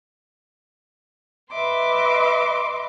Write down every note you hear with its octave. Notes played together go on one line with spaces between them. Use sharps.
B4 D#5 E5 C6 D6